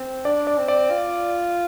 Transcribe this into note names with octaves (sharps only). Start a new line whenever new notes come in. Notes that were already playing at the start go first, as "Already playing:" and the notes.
Already playing: C4
D4 D5
D5
C4
D5
F4